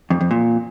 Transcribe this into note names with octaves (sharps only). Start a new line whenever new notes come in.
F2
F2
A#2